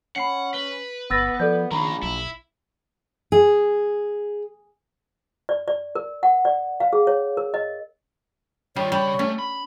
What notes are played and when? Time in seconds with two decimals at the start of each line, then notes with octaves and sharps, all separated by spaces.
0.16 C#4 F#5 B5 C7 C#7
0.54 B4 G7
1.11 G1 B3 E6 A6 A#6
1.40 F3 A4 D5 G6
1.72 A#1 D#3 G#3 C#4 A#5 B5
2.03 B1 E4
3.32 G#4
5.49 D5
5.68 D5
5.95 A#4
6.23 F#5
6.45 D5
6.80 F5
6.93 G#4
7.07 C#5
7.37 A#4
7.54 D#5
8.76 D#3 G3 F4 C#5
8.92 C#3 G3 B5
9.19 A3 C#4
9.39 B5